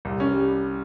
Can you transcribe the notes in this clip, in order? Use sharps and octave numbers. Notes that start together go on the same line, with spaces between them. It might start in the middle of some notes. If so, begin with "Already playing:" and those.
C2
C#4
G3